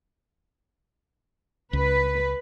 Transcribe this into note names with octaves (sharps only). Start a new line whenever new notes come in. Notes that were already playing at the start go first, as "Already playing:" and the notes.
C#2 B4